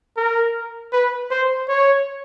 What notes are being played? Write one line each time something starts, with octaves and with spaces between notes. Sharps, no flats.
A#4
B4
C5
C#5